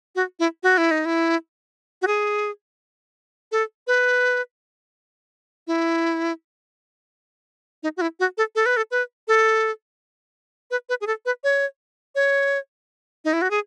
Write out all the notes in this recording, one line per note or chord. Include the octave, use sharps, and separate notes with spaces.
F#4
E4
F#4
E4
D#4
E4
F#4
G#4
A4
B4
E4
D#4
F#4
E4
F#4
A4
A4
B4
A4
B4
A4
B4
B4
G#4
A4
B4
C#5
C#5
D#4
E4
F#4
G#4